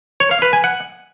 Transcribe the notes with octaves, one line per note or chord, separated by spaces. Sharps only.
C#5
F5
B4
G#5
F#5